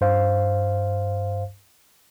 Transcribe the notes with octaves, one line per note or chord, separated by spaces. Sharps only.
G2 C5 F5